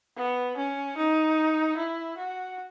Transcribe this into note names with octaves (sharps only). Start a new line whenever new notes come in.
B3
C#4
D#4
E4
F#4